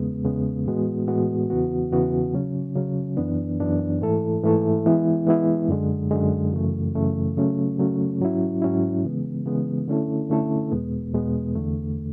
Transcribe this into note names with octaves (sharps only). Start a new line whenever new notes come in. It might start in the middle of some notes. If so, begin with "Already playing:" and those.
Already playing: E2 C#3 G#3 B3
E2 C#3 G#3 B3
A2 E3 G#3 B3 F#4
A2 E3 G#3 B3 F#4
E2 C#3 E3 B3 F#4
E2 C#3 E3 B3 F#4
C#3 F#3 C#4
C#3 F#3 C#4
F#2 E3 B3 D4
F#2 E3 B3 D4
G#2 E3 A3 E4 A4
G#2 E3 A3 E4 A4
E3 G#3 B3 E4
E3 G#3 B3 E4
F#2 D3 G#3
F#2 D3 G#3
F#2 C#3 E3 A3
F#2 C#3 E3 A3
C#3 F#3 A3 C#4
C#3 F#3 A3 C#4
G#2 F#3 C#4 E4
G#2 F#3 C#4 E4
C#3 E3 G#3 B3
C#3 E3 G#3 B3
D3 A3 C#4 E4 A4
D3 A3 C#4 E4 A4
E2 B2 G#3 B3
E2 B2 G#3 B3
E2 D3 A3